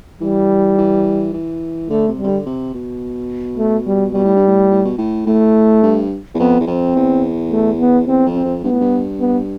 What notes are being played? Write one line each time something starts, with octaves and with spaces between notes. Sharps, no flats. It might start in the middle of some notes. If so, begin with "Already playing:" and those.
E3 G3
E3
E3
D3 A3
C3
G3
C3
D3
C3
B2
A3
G3
B2 G3
A2
G2
A2
A2
B2
A2
A2 A3
G2
E2
F2 B3
E2
F2 C4
E2
A3
B3
E2 C4
F2
C4
F2
G2 B3
A2
G2
B3